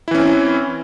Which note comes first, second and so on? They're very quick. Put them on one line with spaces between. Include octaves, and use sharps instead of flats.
E4 E3 C#4 C4